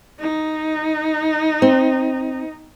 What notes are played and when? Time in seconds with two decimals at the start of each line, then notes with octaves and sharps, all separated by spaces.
0.20 D#4
1.62 C4